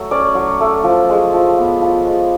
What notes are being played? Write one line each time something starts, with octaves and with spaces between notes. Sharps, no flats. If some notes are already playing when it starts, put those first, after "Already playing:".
Already playing: F#3 A3 F#4
C#4 D5
F#3
A3
F3
G#3
F3
B3
F3
G#3